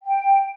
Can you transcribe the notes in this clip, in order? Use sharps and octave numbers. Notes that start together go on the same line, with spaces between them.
G5